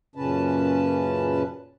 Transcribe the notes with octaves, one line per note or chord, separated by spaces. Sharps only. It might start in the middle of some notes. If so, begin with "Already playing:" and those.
F#2 A#2 C#3 C#4 B4 A5